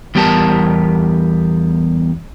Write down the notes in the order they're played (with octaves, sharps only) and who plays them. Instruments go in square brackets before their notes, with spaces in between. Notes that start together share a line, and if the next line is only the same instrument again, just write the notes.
[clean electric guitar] E2 G3 B3 G4 A#4 A5